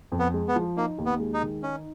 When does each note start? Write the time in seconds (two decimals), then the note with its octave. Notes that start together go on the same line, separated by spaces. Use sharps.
0.12 F2
0.19 B3
0.34 G#3
0.48 B3
0.56 F3
0.77 A#3 D#4
0.98 D#2
1.06 B3
1.20 G#3
1.34 D#4
1.42 D#3
1.63 C#4 D#4